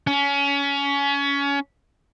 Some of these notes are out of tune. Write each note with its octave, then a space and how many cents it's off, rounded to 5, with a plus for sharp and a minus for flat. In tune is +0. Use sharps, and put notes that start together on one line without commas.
C#4 +25